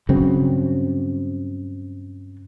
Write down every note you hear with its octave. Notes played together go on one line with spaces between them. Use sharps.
G2 C#3 F#3 C4